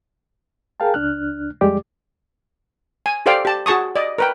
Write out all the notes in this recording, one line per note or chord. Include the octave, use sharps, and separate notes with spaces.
G#4 A#4 F5 G5 A5
C#2 D4 F6 F#6
F2 G3 G#3 G4 D5 D6
G#5
G4 A4 C5 D5 F5 G5
G4 A5
F#4 G#4 A5 C#6 D#6
D5 D#5
A#4 B4 G5